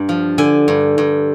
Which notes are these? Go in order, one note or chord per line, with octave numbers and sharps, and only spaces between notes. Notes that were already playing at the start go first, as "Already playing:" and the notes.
Already playing: G2
F3
D3 G#5
G2
G2